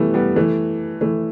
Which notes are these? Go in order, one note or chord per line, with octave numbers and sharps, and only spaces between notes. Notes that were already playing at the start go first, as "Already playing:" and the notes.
Already playing: E3 G3 A3 B3
G3 B3
E3 A3
E3 A3